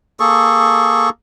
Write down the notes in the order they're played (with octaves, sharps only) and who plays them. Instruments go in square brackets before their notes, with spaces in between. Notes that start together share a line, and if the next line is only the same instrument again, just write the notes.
[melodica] A#3 G#4 A4 C#6